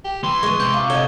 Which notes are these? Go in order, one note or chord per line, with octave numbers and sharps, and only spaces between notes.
G4
E3 C6
G#3 B3 C#6
C3 G6
F4
D3 C#5 D#5 G7